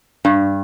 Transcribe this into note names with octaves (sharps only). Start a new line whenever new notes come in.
G2 D4